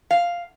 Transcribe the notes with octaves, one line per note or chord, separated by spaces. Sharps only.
F5